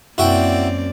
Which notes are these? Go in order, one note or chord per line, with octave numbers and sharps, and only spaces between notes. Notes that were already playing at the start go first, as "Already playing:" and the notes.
F#2 A#3 C4 E4 F#4 D5 G5